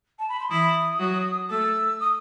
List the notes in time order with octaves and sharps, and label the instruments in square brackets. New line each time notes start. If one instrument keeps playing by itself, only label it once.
[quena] A5
B5
C6
[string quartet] E3 E4 [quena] D#6
[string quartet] F#3 F#4
[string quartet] A3 A4 [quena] E6
[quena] D#6